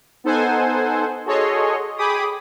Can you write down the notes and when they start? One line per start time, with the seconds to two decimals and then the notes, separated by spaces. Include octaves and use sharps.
0.24 B3 D#4 A4 C5 F#5 G#5
1.26 F#4 G#4 A4 C#5 D#5 C6
1.98 G#4 G5 B5 D6 D#6